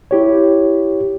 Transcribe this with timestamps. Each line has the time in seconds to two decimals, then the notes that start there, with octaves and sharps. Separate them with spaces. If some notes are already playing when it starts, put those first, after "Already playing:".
0.11 E4 G4 C#5